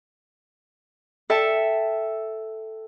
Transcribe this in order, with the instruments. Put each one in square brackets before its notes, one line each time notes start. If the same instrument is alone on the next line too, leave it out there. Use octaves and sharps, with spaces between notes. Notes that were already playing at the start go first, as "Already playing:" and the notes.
[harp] A4 E5 G5